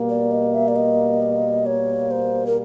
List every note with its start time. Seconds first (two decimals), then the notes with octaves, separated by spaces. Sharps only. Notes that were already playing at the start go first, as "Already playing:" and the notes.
Already playing: B2 G3 A#3
0.09 D5
0.31 D#5
0.54 E5
0.68 D5
0.76 D#5
1.66 C#5
2.11 C5
2.47 A#4